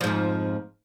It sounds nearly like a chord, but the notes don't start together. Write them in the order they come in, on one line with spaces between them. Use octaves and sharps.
F3 G#2 F2